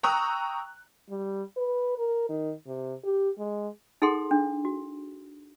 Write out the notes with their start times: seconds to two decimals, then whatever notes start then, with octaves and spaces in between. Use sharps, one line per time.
0.03 G5 A#5 C#6 D#6 E6 F#6
1.10 G3
1.57 B4
1.98 A#4
2.29 D#3
2.67 C3
3.04 G4
3.39 G#3
4.02 D#4 G#4 A4 F#5 C6
4.31 D4
4.65 F#4